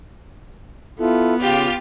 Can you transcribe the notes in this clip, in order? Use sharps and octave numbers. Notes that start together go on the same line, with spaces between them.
B3 E4 F4 A4
C#3 F4 G4